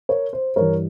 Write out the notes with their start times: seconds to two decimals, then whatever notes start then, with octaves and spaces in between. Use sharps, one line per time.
0.09 A#4 C#5
0.33 C5
0.56 G2 E3 A#4 C#5